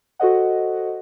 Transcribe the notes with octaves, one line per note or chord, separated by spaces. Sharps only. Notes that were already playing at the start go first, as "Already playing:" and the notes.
F#4 A4 C5 D#5 F#5